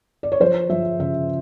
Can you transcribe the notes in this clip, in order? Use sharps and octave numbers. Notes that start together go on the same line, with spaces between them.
D5
C#5
F3 C5
F3 E5
C#3 E5